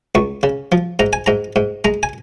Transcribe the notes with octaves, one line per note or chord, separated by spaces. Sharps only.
C#2 C#6
C#3
F3
G#2 A#5
G#5
G#2 A#5
G#2
G#3 A#5
G#5